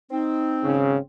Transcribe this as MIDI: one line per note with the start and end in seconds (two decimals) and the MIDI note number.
0.11 1.00 60
0.11 0.75 63
0.63 0.95 32
0.63 0.95 49